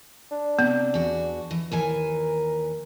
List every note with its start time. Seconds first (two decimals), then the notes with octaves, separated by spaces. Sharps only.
0.31 D4
0.59 C3 B3
0.94 E2 F#4
1.51 E3
1.71 D#2 E3 A#4 G#5